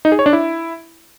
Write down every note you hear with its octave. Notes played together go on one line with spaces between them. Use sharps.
D#4
G#4
C#5
D4
E4